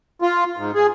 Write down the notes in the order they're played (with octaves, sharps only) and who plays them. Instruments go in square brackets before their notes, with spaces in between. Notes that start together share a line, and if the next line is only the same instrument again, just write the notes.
[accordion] F4
G#2
G#4